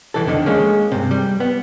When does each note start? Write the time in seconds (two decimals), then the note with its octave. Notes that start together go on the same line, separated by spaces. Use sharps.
0.14 C2 E3 A4
0.26 F2 D3 D#3
0.46 G#3 A#3 C#4
0.92 G2 C3
1.11 G3
1.40 B3